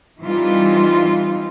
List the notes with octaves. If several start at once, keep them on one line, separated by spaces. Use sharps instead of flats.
E3 G3 C4 D#4 F4